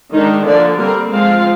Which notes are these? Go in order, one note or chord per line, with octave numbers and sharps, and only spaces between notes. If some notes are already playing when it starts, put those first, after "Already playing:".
D#3 G#3 D4 D#4
D3 F3 A#3 D4 D5
G3 A#3 C4 A#4
F3 G#3 C4 F4 F5